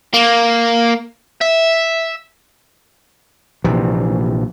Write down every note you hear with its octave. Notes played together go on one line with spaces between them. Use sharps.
A#3
E5
A#1 C3 E3 F3